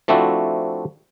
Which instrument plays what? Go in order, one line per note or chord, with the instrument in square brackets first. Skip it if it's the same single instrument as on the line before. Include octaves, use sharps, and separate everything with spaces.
[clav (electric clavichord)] F3 A3 C4 D4 E4 F#4